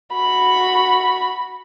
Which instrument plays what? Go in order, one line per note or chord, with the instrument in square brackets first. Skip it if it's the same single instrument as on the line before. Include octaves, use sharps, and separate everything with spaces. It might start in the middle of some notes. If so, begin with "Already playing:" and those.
[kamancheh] F#4 B5